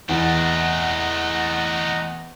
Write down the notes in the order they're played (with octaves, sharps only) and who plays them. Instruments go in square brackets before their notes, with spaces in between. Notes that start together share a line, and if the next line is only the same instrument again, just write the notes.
[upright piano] E2 [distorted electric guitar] A3 C4 [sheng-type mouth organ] D#5 F#5 A#5